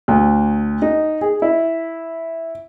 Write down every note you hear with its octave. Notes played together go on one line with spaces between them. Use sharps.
D2
D#4
G#4
E4